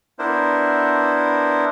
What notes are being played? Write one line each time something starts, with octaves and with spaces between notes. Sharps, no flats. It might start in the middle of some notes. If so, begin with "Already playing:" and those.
B3 D4 E4 A#4 C5